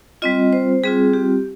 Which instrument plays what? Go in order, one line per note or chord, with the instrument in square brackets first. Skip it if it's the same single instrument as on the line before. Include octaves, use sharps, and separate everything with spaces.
[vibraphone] G3 C4 F4 D#5
C5
G3 C4 F4 G#4
G4